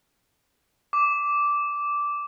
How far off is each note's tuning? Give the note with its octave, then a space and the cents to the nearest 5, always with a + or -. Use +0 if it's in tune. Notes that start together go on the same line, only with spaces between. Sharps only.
D6 -10